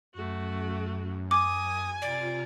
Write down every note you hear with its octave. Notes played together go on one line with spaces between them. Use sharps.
F#2 A3 F#4
G#5 D6 D#6
C3 F4 D5 A#5